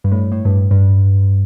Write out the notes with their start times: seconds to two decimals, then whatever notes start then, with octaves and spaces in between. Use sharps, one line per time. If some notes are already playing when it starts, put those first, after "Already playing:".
0.04 G2
0.12 A2
0.32 A2
0.45 G2
0.71 G2